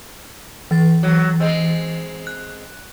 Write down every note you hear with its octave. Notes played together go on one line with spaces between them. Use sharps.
E3 A6
F#3
G#3 C4
F#6